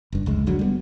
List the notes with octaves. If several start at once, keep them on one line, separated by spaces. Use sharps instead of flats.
F#1 G2
F1 C#2 G#3
F1 D3 F#3
G3 G#3 B3